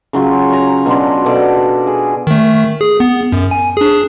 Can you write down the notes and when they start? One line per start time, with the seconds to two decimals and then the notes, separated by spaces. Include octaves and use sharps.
0.13 C#3 F#3 F4
0.49 C#5 A#5
0.86 B2 D4 C6
1.26 B2 F4 A4 D5
1.87 G#4
2.27 D#3 A3
2.81 G#4
3.00 B3
3.32 F#2
3.51 G#5
3.77 D4 G#4